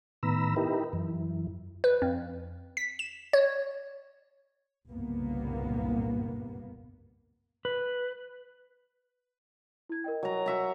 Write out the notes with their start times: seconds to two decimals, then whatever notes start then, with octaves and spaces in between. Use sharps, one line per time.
0.23 A2 D#3 B3 A#5 B5 E6
0.56 D#4 E4 G4 A#4 B4
0.93 F#2 E3
1.84 B4
2.02 F2
2.77 B6
2.99 E7
3.33 C#5
4.90 F#1 C2 G2 A#2 A#3 B3
7.65 B4
9.89 E4 G#6
10.04 A#4 D#5 G5
10.23 F#3 A#5
10.46 F#4 E5 A#5